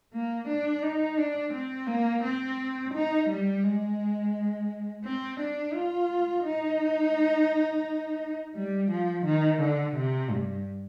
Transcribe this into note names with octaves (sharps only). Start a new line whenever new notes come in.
A#3
D4
D#4
D4
C4
A#3
C4
D#4
G3
G#3
C4
D4
F4
D#4
G3
F3
D#3
D3
C3
G2